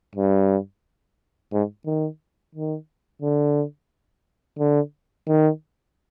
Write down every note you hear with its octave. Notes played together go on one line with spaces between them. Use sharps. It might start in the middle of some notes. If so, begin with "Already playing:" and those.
G2
G#2
D#3
D#3
D3
D3
D#3